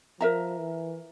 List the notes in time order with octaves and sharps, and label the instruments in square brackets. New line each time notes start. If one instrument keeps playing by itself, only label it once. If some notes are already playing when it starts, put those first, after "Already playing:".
[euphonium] F3 [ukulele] A#4 E5 A#5
[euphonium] E3